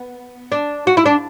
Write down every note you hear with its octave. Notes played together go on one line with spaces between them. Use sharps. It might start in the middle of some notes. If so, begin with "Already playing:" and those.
Already playing: B3
D4
F#4
E4
D4